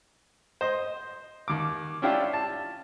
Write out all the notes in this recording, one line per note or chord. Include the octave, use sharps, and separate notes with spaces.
C5 D#5
D#2 D6
C#4 D4 E4 F4 G4
A5